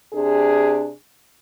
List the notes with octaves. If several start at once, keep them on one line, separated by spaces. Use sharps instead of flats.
C3 D4 G#4